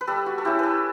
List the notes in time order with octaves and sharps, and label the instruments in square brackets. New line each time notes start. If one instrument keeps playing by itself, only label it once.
[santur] B4
G3 A4
F#4
A4
C#4 E4 G4
A4 B4